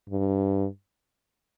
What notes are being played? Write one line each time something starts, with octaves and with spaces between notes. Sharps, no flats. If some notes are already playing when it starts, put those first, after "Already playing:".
G2